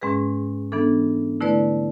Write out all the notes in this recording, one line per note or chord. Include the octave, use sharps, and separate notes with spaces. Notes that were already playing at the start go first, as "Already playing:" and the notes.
G#2 G#3 C#4 G#4 B4
E3 B3 D4 A4
D3 A3 E4 B4 D5